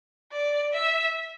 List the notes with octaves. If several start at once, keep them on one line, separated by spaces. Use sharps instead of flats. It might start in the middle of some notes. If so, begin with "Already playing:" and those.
D5
E5